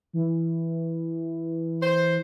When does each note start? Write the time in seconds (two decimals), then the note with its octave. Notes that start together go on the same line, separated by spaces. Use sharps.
0.13 E3
1.81 C5